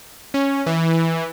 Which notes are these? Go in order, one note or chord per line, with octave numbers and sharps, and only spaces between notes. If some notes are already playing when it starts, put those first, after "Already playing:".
C#4
E3